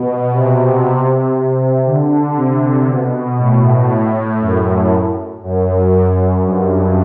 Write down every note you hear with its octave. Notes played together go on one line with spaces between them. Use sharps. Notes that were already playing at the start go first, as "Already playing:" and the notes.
Already playing: B2
C3
D3
C3
B2
A2
A2
F#2
F#2
G2